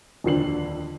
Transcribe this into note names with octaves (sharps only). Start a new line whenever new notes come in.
D#1 F2 D3 C7 F#7